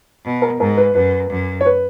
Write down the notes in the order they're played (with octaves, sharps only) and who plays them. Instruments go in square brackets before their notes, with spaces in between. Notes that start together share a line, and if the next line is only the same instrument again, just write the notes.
[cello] B2
[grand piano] A#4
[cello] G#2 [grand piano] A#4
[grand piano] B4
[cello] F#2 [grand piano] B4
[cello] F#2
[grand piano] C#5
B4